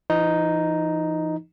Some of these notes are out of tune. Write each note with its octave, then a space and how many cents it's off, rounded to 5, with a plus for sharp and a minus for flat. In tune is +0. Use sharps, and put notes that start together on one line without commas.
E3 +45 D#4 +0